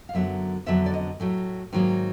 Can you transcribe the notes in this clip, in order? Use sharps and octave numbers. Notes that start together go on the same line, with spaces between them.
F5
F#2 D3 F#3 B3 E5
F2 D3 F#3 B3 D4 E5
D5
D#5
A2 F#3 A3
G#2 D#3 F#3 A#3